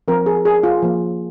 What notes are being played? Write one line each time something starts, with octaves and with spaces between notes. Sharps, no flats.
F3 C4 A#4
G#4
G#4
F4
F3 A#3